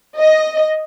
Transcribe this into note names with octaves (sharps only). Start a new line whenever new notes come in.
D#5